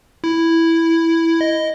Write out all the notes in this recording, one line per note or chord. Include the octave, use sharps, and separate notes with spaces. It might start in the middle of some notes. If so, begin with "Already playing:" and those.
E4
D#5